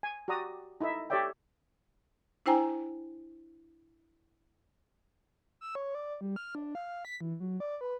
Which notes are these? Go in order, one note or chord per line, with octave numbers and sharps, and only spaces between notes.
G#5
F#4 G4 D5 A#5 D#6
D#4 E4 A4 E5
G4 A4 C#5 D5 E5 G5
D4 E4 C5 G5 G#5 A#5
E6
C#5
D5
G3
F6
D4
F5
B6
E3
F#3
D5
B4